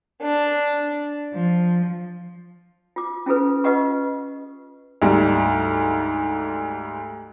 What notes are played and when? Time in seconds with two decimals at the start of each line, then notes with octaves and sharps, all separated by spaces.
0.22 D4
1.33 F3
2.96 F4 D6
3.26 C#4 E4 F4 G#4 A4 B4
3.64 F4 G4 B4 D#5 F#5 C#6
5.02 D2 G#2 G3